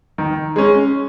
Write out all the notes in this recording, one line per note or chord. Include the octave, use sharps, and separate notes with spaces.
D#3
G#3 C#4